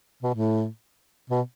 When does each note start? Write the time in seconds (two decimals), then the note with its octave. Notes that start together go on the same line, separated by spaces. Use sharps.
0.23 B2
0.35 A2
1.30 B2